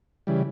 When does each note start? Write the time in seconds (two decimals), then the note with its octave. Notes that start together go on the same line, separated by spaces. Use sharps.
0.27 C#3 E3 G3